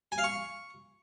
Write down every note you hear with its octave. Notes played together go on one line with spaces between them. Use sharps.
G#5
F5
C#6